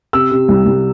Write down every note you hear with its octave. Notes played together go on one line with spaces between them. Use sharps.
C3 E6
C3
C2
C2